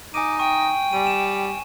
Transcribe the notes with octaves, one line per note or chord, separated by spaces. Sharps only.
D#4 G#5 D6 D#7
G5 C#6 D#7
G3 G#5 D#7
E7